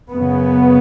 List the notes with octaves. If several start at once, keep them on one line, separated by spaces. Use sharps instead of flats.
F#2 C#3 B3